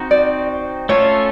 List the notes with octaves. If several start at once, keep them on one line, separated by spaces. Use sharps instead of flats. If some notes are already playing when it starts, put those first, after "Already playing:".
Already playing: C4 D#4 F#4
D5
A3 C#4 F4 A4 C#5